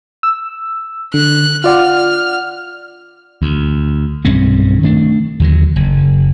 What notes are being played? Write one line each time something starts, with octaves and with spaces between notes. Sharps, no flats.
E6
D3 F#6
F4 D5 F#5 F6
D2
B1 G2 C4 C#4
D#3 A3 D4
D#2 D3 F#3
F#1